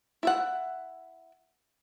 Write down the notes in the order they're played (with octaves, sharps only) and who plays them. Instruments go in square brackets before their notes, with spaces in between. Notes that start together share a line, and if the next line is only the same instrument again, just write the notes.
[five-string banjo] E4 E5 F#5